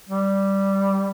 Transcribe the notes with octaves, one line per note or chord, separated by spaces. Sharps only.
G3